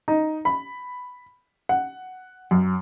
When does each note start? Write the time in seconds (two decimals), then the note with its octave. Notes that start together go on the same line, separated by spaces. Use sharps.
0.08 D#4
0.45 B5
1.69 F#5
2.51 F#2